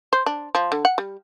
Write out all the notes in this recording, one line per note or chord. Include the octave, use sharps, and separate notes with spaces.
C5
D4
F3
D3
F#5
G3